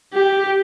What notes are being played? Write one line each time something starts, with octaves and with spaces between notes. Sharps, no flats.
G4